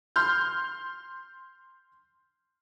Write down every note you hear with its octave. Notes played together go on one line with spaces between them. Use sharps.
C6 F6 G6